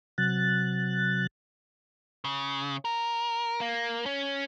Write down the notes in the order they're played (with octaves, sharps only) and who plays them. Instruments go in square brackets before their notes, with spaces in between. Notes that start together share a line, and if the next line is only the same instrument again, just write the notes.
[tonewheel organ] C3 F#3 F#6 A6
[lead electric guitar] C#3
A#4
A#3
C#4